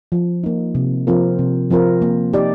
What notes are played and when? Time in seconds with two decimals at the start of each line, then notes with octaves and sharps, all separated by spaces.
0.12 F3
0.44 A#3 D#4
0.75 C3
1.07 F3 C4 F4 A#4
1.39 C3
1.70 F3 C4 F4 A#4
2.02 A#3
2.33 D#4 G4 D5